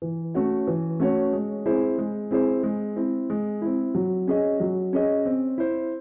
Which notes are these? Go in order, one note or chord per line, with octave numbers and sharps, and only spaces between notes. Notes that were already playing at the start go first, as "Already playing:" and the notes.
E3
A3 C#4 F#4 C#5
E3
A3 C#4 F#4 C#5
G#3
C4 E4 G#4 C5
G#3
C4 E4 G#4 C5
G#3
C4 E4
G#3
C4 E4
F#3
C#4 G#4 D#5
F#3
C#4 G#4 D#5
C4
E4 C5